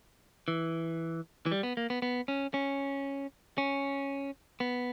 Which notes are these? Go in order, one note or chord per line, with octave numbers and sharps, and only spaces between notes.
E3
E3
G3
B3
A#3
B3
B3
C#4
C#4
C#4
B3